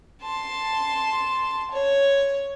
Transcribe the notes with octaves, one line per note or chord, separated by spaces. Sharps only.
A5 C6
C#5